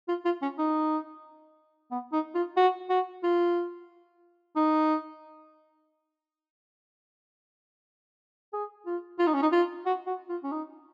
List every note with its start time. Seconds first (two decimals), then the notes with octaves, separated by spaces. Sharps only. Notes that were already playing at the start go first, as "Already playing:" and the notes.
0.08 F4
0.25 F4
0.42 C#4
0.58 D#4
1.91 B3
2.13 D#4
2.35 F4
2.57 F#4
2.90 F#4
3.23 F4
4.56 D#4
8.53 G#4
8.86 F4
9.19 F4
9.27 D#4
9.34 C#4
9.42 D#4
9.52 F4
9.86 F#4
10.07 F#4
10.29 F4
10.44 C#4
10.52 D#4